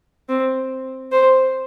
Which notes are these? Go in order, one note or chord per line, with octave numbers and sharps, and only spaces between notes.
C4
C5